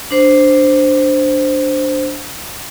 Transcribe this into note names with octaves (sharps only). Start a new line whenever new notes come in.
D4 C5